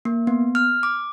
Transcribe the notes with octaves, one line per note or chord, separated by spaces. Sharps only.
A#3
B3
F6
D6